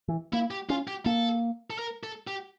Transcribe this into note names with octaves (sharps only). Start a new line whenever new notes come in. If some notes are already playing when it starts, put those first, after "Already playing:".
E3
A#3 E4
G4
C#4 F4
G4
A#3 A4
A4
A#4
A4
G4